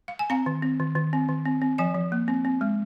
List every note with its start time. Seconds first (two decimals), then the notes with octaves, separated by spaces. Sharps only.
0.08 F5
0.19 G#5
0.30 C4 F5 A#5
0.46 D#3
0.62 C4
0.80 D#3
0.95 D#3
1.13 C4
1.29 D#3
1.45 C4
1.62 C4
1.78 F3 D#5 G#5
1.95 F3
2.12 A#3
2.28 C4
2.45 C4
2.61 G#3